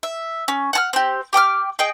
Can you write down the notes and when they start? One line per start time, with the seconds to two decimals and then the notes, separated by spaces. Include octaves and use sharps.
0.03 E5
0.48 C#4
0.73 F#5 G#5 F6
0.93 C4 G4
1.33 G4 G5 D6 F6
1.79 G#4 D#5 G5